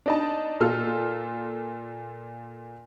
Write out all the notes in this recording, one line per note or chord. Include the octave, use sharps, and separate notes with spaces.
D4 D#4 A5
A#2 F4 A4 F6